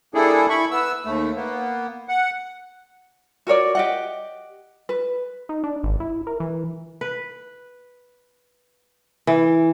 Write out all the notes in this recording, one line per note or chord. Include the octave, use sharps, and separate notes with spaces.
G3 A#3 D4 E4 G#4 A4
E4 B5 C#6
B3 E6
D#2 A3
A#3 B3
F#5
F#4 A#4 C#5 D5
G4 D#5 F#5
B4
D#4
D4
G#1
E4
A#4
E3
B4
E3